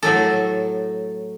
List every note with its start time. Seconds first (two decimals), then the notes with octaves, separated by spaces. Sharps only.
0.03 A2 F#3 A4